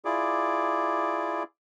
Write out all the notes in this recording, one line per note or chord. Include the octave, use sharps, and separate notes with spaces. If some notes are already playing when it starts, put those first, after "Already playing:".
E4 F4 G#4 D5 D6